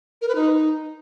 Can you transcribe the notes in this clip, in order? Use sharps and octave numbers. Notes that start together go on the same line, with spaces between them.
A#4
B4
D#4